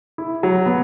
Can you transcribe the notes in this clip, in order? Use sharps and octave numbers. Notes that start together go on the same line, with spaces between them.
E4
F#3
B3